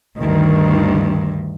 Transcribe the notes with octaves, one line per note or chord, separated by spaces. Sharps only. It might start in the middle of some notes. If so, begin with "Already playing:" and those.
D2 G2 D#3